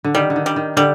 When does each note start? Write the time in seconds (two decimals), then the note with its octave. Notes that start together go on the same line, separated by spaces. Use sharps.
0.04 D3
0.15 D#3 G3
0.30 D3
0.36 D#3
0.46 G3
0.56 D#3
0.77 D3 G3